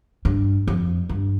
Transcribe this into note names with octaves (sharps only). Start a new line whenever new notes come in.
G2
F2
G2